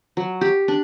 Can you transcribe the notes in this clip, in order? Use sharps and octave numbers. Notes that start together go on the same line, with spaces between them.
F#3
G4
D4